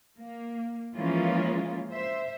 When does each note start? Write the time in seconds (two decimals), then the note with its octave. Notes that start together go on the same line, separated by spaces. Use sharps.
0.17 A#3
0.95 E3 F3 G#3 A#3 C#4 F4
1.91 C5 E5